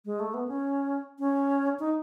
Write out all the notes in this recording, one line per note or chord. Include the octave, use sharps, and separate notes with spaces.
G#3
A3
B3
C#4
C#4
D#4